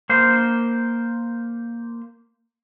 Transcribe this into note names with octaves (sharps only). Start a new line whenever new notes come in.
A#3 C5